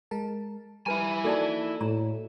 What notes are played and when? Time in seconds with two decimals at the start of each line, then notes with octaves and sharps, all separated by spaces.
0.11 G#3 A#4 A5
0.86 G3 E4 B4 G#5 A#5
1.24 A#3 D#4 F#4 A4 D5 A5
1.81 A2 A#5